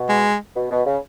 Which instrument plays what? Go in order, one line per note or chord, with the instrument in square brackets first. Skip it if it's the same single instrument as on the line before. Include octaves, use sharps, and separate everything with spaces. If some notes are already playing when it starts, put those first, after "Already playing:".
Already playing: [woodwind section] B2
[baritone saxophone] G#3
[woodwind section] B2
B2
C#3